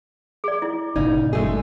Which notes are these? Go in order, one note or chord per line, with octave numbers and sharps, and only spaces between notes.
G#4 D5
E4
G1 A#2 C#3 D#4 D5
G#3 A3 G#4